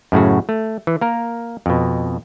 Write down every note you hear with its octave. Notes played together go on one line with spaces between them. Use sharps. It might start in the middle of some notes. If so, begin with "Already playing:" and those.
F#2 A2 C#3 F#4
A3
E3
A#3 A#4
F2 B2